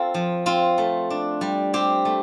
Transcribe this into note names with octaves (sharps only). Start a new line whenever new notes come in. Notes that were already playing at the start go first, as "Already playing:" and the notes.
Already playing: C4 F4 A4
F3
C4 F4
A3
D4
G3
C4 G4
A3